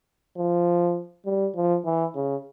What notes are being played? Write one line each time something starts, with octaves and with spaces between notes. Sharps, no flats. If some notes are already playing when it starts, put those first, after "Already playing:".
F3
G3
F3
E3
C#3